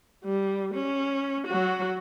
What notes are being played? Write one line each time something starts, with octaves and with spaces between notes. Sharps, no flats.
G3
C#4
F#3 F#4